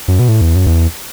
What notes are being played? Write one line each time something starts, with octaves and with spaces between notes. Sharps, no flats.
F#2
B2
A2
E2
F#2
E2